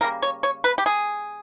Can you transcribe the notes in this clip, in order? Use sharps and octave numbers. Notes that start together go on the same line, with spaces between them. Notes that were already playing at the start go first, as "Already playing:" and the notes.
C#3 G3 A#3 A#4
C#5
C#5
B4
G4
G#4